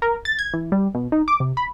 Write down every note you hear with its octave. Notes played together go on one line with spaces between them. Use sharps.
A#4
A6
G#6
E3
G3
B2
D#4
D6
C3
B5